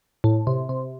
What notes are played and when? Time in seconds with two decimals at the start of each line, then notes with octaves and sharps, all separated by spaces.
0.24 A2
0.47 C3
0.69 C3